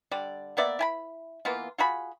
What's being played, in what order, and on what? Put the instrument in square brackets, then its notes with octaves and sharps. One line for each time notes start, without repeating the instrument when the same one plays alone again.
[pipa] D3 G3 D5
A#3 B3 D5 E5
E4 G#5 B5
E3 A#3 B3 F4
F4 F#4 G#4 B5